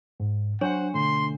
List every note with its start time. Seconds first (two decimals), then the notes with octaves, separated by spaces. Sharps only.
0.20 G#2
0.61 F#3 D4 C5 C#5 F#5 G5
0.94 B2 D3 A3 C6